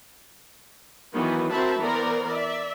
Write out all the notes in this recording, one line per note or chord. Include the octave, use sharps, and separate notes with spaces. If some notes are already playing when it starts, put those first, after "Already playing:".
D#3 E3 F#3 B3
C4 F#4 A#4 E5 A5 B5
E3 B3 A#4 C5 D5 A#5
D5 E5